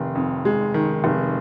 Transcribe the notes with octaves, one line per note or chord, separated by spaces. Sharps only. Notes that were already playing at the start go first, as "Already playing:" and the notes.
Already playing: F1 D#3
F2
G#3
D#3
F1